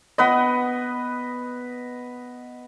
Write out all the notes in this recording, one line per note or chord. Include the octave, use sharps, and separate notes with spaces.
B3 B4 D#5